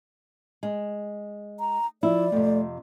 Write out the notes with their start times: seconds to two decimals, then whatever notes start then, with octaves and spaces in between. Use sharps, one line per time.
0.63 G#3
1.60 A#5
2.03 F3 E4 D5
2.32 F2 C3 A3